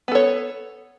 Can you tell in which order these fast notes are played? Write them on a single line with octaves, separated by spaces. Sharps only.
B3 A4 C#5